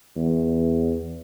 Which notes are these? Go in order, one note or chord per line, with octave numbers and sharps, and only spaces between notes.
E2